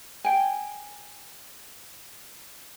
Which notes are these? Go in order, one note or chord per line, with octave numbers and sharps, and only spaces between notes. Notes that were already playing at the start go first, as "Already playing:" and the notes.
G5 G#5